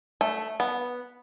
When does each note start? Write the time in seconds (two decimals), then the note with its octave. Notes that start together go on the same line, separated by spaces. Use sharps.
0.21 A3
0.60 B3